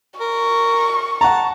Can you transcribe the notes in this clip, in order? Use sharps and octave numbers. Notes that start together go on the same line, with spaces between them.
A#4 C#6
F#5 A5 A#5